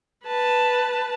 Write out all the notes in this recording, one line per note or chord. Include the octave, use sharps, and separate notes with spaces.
B4 A5